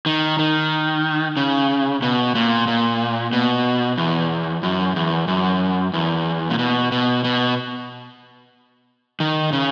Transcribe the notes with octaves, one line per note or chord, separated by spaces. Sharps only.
D#3
D#3
C#3
B2
A#2
A#2
B2
E2
F#2
E2
F#2
E2
A#2
B2
B2
B2
D#3
C#3